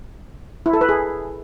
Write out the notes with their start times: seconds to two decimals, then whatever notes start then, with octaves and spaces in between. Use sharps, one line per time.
0.66 E4
0.73 A4
0.81 B4
0.89 G#4